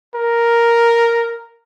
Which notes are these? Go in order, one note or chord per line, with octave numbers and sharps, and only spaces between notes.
A#4